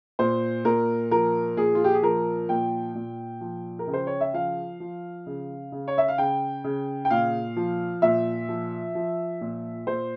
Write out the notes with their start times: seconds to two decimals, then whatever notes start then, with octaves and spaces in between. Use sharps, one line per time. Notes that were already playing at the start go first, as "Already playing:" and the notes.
0.19 A#2 C5
0.65 A#2 A#4
1.11 F3 A#4
1.57 A#2 G#4
1.75 F4
1.84 G4
1.94 G#4
2.03 F3 A#4
2.49 A#2 G5
2.95 A#2
3.41 F3
3.79 A#4
3.87 C#3
3.93 C5
4.07 C#5
4.21 E5
4.34 F3 F5
4.80 F3
5.26 C#3
5.72 C#3
5.88 C#5
5.98 E5
6.08 F5
6.18 C#3 G5
6.64 C#3
7.05 G5
7.10 A#2 F5
7.56 F3
8.02 A#2 E5
8.49 F3
8.95 F3
9.41 A#2
9.87 A#2 C5